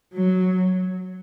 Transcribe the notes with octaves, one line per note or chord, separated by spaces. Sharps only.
F#3